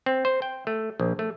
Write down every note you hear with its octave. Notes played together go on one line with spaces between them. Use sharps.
C4
C5
G5
A3
A#1
A3